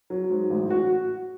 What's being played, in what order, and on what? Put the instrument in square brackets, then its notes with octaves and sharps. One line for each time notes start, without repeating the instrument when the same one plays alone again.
[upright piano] F#3
G#2
A1
F#4